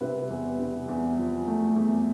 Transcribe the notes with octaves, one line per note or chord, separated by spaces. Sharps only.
C3 B4
E2
C3
E2
F3
A3
E2